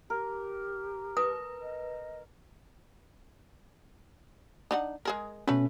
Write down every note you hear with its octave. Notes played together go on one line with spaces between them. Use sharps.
G4 A#4
B4 D#6
D#5
D4 D#4 F#5
G#3 G#4 A#4
B2 A3 C#4 B4